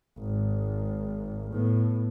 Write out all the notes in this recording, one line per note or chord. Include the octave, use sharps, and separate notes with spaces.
G#1 G#2
A2 B3